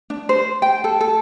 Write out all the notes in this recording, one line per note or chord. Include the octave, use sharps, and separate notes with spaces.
D4
C5
G5
A4
A4